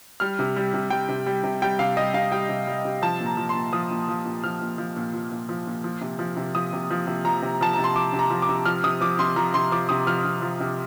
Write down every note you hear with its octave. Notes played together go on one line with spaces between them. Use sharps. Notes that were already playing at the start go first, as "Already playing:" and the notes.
G3 F6
C3
G3
C3
G3 G5
C3
G3
C3
G3 G5
C3 F5
G3 D#5
C3 F5
G3 G5
C3
G3
C3
F3 A5
A#2
A#5
F3
C6
A#2
F3 D#6
A#2
F3
A#2
F3 F6
A#2
F3
A#2
F3
A#2
F3
A#2
F3
C3
F3
C3
F3 D#6
C3
F3
C3
F3 A#5
C3
F3 A5
A#5
C3
C6
F3 D6
C3
A#5
F3
D6
C3
F3 F6
C3 D#6
F3 D6
C3 C6
F3 A#5
C3 C6
F3 D6
C3 D#6
F3 F6
C3
F3
C3